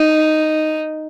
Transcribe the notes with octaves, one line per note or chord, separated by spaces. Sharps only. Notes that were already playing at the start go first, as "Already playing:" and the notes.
Already playing: D#4